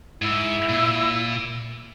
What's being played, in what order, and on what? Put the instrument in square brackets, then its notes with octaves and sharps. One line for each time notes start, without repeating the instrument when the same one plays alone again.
[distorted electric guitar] G#2 [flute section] E4
[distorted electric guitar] A#2